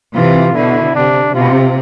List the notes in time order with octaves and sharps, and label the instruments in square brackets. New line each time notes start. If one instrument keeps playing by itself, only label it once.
[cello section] C3 E3 [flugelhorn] F4
[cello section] B2 D3 [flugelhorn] E4
[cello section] C3 [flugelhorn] D4
[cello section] C3 [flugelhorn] F4